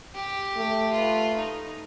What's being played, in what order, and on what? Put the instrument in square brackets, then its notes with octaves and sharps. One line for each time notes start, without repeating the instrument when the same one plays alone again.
[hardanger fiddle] G4
[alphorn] A3
[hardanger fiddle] F4 B4
D#4